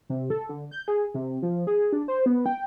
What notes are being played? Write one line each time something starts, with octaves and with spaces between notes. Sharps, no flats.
C3
A4
D3
G6
G#4
C3
F3
G#4
D4
C5
B3
G5